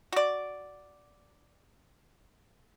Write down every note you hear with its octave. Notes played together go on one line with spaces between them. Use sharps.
F#4 D5